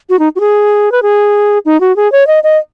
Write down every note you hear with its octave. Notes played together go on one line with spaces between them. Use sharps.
F#4
D#4
F#4
G#4
B4
G#4
D#4
F#4
G#4
C#5
D#5
D#5